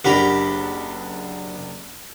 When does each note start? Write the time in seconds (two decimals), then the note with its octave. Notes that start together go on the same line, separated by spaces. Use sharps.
0.05 F#1 D4 G4 A#4 F#5 B5